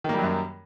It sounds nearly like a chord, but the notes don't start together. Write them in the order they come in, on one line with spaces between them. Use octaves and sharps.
D#3 A#3 G3 F#3 F#2